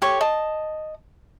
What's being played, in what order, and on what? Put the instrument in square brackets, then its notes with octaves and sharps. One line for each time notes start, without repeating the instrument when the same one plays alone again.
[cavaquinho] G4 A4 C#5 C#6
D#5 A5